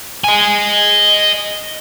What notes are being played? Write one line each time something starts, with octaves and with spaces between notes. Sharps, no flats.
D#5 G#5